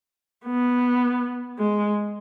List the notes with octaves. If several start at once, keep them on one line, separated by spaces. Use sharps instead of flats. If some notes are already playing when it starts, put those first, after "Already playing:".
B3
G#3